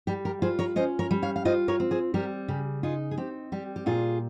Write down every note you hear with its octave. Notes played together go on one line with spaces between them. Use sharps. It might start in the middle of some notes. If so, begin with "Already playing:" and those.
G3 G4
G4 A#4
F4 G#4 C5
A#4 C#5
C#4 C5 D#5
A#4 C#5
G3
C#5 F5
F5
F4 C5 D#5
A#4 C#5
C4
G#4 C5
G3 G4 A#4
C#3 G4
D#4 F4 G#4
G#4
C4 G4
G3 G4
G4
A#2 F4 G#4